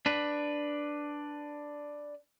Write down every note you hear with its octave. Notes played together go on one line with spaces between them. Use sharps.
D4 B4